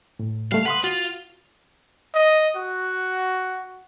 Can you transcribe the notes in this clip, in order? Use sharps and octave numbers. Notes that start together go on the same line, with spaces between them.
A2
G3 A3 F5
B4 F#5 C6 D#6
F4 F#4
D#5
F#4